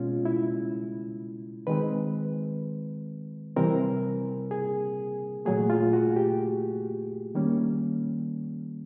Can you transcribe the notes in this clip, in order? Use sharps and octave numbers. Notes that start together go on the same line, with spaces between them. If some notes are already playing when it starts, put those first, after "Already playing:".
Already playing: B2 G#3 C#4 F4
E4
D#3 G#3 C4 B4
C3 E3 G3 C4 A#4
G#4
A#2 F#3 A3 G#4
F4
F#4
G4
D#3 G3 A#3 C#4